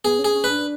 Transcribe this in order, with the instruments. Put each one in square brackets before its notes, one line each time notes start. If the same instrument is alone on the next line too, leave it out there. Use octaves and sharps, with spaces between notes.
[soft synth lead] B3 [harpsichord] G#4
[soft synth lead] C#4
[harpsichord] G#4
[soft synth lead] C#4
[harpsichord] B4
[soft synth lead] D4